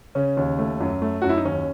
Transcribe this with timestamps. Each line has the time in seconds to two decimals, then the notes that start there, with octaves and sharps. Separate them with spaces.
0.15 C#3 C#4
0.37 D#2
0.59 A3
0.80 F#2
1.02 A3
1.22 F#2 F#4
1.29 E4
1.37 D#4
1.45 D#2 C#4